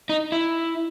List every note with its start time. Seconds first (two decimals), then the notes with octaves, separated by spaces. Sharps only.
0.09 D#4
0.32 E4